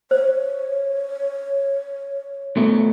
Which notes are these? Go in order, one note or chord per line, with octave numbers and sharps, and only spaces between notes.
C5 C#5
B2 A3